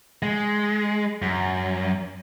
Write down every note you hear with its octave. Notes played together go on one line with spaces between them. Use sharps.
G#3
F#2